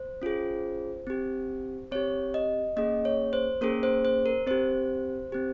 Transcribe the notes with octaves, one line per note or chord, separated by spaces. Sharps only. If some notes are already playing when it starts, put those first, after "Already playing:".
Already playing: C5
C#4 F4 G#4
C4 G4
C4 G4 C#5
D#5
A#3 C#4 G#4 D#5
C#5
C5
A#3 C#4 G#4 A#4
C5
C5
A#4
C4 G4 C5
C4 G4